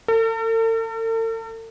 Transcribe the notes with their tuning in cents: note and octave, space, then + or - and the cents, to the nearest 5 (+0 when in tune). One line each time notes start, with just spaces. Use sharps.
A4 +45